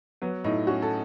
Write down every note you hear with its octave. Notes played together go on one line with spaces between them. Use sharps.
F#3 B3
A2 D#4
C#4 F#4
A4